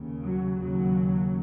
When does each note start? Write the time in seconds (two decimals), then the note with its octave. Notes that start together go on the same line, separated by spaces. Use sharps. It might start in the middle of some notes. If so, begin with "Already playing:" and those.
Already playing: D#2 C#3
0.23 F#3
0.60 D#2 C#3 F#3